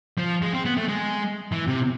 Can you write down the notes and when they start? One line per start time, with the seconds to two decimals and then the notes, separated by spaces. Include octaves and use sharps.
0.18 F3
0.42 G#3
0.54 C4
0.65 B3
0.77 A3
0.89 G#3
1.52 E3
1.68 C3